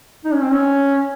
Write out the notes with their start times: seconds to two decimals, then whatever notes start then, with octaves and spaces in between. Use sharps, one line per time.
0.25 D#4
0.33 C#4
0.43 C4
0.52 C#4